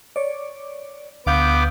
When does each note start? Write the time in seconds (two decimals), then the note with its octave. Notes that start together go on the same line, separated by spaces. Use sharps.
0.16 C#5 D5
1.26 D2 B3 F5 D6 G6